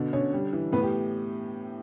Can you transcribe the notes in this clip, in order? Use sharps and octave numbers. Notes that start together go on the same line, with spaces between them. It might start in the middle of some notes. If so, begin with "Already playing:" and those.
Already playing: B2 D3
D3 C#4 C#5
G3
E3
A2 B3 B4
G4